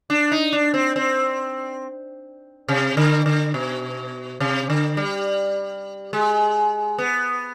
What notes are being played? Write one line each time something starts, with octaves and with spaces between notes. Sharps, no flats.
D4
D#4
D4
C4
C4
C3
D3
D3
B2
C3
D3
G3
G#3
B3